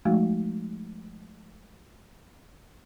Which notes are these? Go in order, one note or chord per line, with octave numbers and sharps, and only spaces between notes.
F3 G#3 A3 D#4 F#4 F5